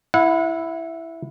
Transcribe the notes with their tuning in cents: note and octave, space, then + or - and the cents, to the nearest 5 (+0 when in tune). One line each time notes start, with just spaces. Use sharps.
E4 +0 F#5 -30